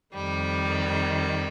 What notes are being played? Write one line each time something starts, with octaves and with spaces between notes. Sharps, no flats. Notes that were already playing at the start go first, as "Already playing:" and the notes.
F2 D#3 G3